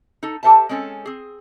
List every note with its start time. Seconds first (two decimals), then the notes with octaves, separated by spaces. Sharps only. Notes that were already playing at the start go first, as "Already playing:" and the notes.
0.23 D#4 A4
0.43 G4 A4 C5 E5 A5
0.69 G#3 C4 C#4 A4 G#5
1.06 C4 G#4